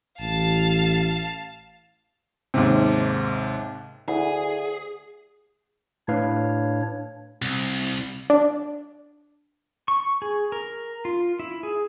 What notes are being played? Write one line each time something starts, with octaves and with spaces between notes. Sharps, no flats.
A1 F5 A5
D#2 G#2 C3
D2 E4 G#4
A2 D4 B4 C#5 F5
C2
D4
C#6
G#4
A#4
F4
E4
G#4